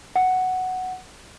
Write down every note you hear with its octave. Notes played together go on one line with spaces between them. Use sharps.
F#5